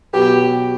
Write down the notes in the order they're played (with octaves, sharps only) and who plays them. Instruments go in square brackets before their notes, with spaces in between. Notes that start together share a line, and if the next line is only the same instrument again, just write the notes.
[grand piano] B2 F#3 B3 F#4 B4 [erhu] G4